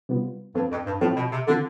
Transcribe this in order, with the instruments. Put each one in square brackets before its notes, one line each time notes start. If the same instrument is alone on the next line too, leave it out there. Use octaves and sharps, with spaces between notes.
[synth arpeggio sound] C3 G3 B3 F4
[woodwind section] G2 [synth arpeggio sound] F3 C4 F4 A4
[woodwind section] F2
G2
[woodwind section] A2 [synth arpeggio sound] F3 C4 F4 A4
[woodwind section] B2
C3
[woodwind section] D3 [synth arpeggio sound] F3 C4 F4 A4